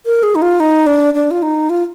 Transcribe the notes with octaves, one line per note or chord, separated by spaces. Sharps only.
A#4
G#4
D#4
F4
D#4
D4
D4
F4
D#4
F4